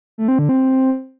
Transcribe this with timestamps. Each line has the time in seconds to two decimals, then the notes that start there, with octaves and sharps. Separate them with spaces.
0.18 A3
0.28 C4
0.39 D3
0.49 C4